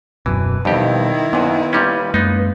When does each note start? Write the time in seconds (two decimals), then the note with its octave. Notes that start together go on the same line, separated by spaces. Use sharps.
0.26 D#1 F#2 B2 E3 B4
0.65 F2 B2 D#3 G3 E4 G4
1.33 F#2 A#2 B3 B4
1.73 A#2 G3 C#4
2.14 F#2 G#3 A#3 B3 D#4